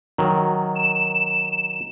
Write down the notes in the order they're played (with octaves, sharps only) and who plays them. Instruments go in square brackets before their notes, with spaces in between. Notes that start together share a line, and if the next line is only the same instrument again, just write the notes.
[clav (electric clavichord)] D#3 F#3
[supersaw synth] E7